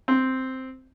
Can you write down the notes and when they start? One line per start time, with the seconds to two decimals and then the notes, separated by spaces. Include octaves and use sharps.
0.08 C4